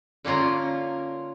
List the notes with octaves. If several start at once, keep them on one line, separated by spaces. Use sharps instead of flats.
D3 A#3 C#4 F4 A#4